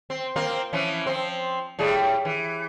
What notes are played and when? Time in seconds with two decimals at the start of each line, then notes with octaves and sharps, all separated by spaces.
0.10 C4
0.36 A#3 C4 F4
0.73 E3 F3 C#4
1.06 F3 C4
1.79 A2 G3 G#4
2.25 E3